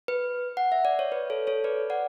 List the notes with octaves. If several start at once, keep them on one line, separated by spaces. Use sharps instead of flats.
B4
F#5
E5
D5
C#5
B4
A4 C#5
A4 C#5
B4 D5
D5 F#5